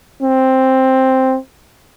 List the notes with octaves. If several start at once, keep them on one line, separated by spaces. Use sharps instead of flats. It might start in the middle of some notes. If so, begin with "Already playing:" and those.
C4